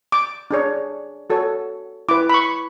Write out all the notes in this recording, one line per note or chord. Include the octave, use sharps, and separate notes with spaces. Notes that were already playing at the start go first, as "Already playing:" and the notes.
D6
D4 G#4 C#5
F#4 A4 C#5
E4 B4 D6
B5
C#6